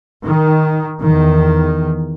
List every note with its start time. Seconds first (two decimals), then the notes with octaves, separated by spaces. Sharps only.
0.24 D#3
1.03 E2 D#3